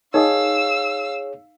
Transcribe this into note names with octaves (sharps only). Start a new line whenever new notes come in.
D#4 G#4 A#4 C#5 D#5 F5 E6